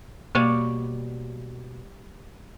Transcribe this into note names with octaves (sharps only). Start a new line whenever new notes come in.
B2 G3 A#3 C#5 D5